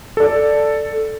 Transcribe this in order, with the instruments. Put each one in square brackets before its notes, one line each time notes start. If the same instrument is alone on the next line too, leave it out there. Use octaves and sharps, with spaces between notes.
[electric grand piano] A4 D5